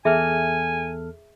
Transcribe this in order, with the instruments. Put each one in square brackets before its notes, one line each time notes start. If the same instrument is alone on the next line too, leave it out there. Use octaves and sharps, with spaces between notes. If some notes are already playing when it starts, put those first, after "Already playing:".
[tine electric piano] E2 A4 F6 [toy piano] G#4 E5 [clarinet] G#5